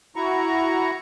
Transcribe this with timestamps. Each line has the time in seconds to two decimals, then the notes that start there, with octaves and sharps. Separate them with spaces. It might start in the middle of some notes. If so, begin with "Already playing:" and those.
0.16 E4 F#4 A#5 C#6